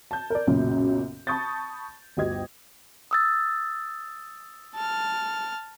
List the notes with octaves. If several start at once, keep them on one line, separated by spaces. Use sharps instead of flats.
A5 G6
A#4 D5
B1 F#2 A#2 C#3 F#3
A5 B5 C#6 D#6 G6 A6
G1 D2 G4 D#5 G#6
D#6 E6 A6
A5 F6